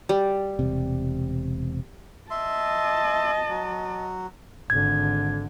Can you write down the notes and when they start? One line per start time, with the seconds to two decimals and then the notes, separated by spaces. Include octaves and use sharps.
0.09 G3
0.59 E1 C3
2.30 D#5 E5 A5 C6
3.49 F#3
4.70 G#1 D3 G#6